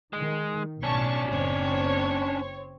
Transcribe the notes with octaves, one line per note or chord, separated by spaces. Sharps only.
D#3 G#3
B1 A2 C#4 D4 A5 C#6
F#1 C4 C#5